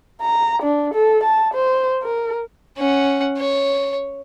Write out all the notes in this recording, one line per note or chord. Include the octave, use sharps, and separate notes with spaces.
A#5
D4
A4
A5
C5
A#4
C#4 F#5
C#5